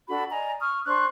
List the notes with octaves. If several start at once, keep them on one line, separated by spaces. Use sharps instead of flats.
D4 F#4 A4 B5
D5 D#5 G#5 A#5
C#6 D#6 F6
D4 C5 C#6 F#6